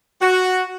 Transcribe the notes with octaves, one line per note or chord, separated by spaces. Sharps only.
F#4